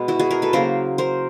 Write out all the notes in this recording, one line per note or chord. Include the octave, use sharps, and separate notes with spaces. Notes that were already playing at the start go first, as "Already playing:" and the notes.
Already playing: B2 G#3 B3
E4 F#4
F#4 G#4
G#4 A#4
A4 B4
C#3 F#3 A#3 A#4 C5
A#4 C5